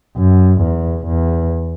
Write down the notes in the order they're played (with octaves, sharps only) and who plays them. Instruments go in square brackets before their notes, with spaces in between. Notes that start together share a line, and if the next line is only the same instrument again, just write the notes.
[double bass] F#2
E2
E2